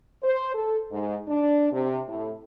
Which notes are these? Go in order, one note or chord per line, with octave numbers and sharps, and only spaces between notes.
C5
A4
G#2
D4
C3
A2